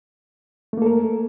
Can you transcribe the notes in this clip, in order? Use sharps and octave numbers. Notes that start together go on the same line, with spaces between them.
A3 A#3 A4 A#4